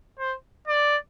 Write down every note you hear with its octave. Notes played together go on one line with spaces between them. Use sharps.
C5
D5